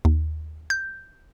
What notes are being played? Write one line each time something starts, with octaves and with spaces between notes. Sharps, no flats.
D#2
G6